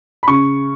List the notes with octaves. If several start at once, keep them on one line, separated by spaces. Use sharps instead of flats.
B5
C#3 C#6